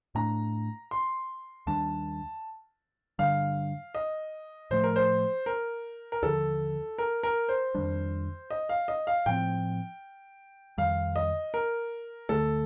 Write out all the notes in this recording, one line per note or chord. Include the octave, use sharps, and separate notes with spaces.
A2 A3 D4 A#5
C6
D#2 D#3 G3 D4 A5
G2 D3 G3 D4 F5
D#5
A2 F3 A3 C5
A#4
C5
A#4
A#4
D#2 D3 F3 A4
A#4
A#4
C5
F2 D#3 G3 D4
D#5
F5
D#5
F5
A2 F3 C4 G5
F2 D#3 G3 F5
D#5
A#4
D2 D3 A3 A4